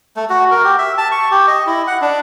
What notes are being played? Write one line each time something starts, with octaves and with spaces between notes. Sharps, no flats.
A3
F#4
A#4
G4
E5
A5
C#6
G4
D#5
E4
F#5
D4